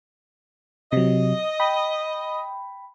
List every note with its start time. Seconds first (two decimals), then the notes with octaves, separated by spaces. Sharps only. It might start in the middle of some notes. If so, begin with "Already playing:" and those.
0.92 C3 F#3 D#5
1.60 G5 B5